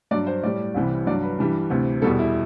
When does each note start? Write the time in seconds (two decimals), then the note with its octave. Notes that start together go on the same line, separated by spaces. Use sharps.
0.11 G2 F#3 D5
0.27 C5
0.43 A2 G3 D5
0.74 C2 C3 E3 G3
1.07 G2 F#3 D5
1.23 B4
1.39 G2 E3 G3
1.70 D2 C3 E3
2.02 E2 B2 G3 A4
2.19 E4